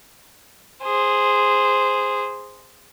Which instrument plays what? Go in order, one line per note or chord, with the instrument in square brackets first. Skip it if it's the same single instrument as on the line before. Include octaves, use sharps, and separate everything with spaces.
[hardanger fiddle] G#4 C5